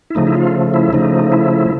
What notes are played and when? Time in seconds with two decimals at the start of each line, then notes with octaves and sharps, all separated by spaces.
0.10 E4
0.15 C#3 F3 A3 D#4
0.27 E4
0.35 F4
0.74 E4
0.93 C#3 F3 A3 D#4
1.32 E4